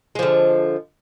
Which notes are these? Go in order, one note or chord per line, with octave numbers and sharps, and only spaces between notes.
D3 F3 G#3